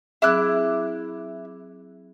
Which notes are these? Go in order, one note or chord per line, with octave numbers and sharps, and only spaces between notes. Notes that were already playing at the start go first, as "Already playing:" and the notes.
F#3 C4 E4 G#4 D6 F#6